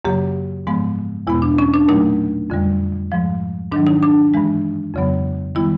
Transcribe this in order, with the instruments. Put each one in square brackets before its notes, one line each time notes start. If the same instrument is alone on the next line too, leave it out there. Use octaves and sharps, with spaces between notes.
[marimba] F#2 C#3 F#3 A#3 G4
G#2 F3 G#3 B3
E2 B2 G#3 B3 E4
D4
C#4
D4
A#2 F#3 A3 D#4
F2 D3 G3
G#2 F3 G#3
G#2 D#3 F#3 D4
D#4
D4
G2 E3 G#3
F2 C#3 F#3 B3
D#3 G3 B3 E4